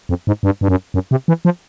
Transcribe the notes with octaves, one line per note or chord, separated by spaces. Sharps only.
F2
G#2
G2
G2
F#2
F#2
C3
E3
F3